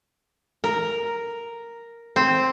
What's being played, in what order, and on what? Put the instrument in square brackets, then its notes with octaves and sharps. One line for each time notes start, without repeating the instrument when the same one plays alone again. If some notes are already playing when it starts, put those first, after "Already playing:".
[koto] A#4
C4